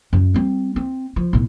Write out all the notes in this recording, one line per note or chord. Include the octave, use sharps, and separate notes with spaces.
F#2
G3 C4
C4
F3
B1 A2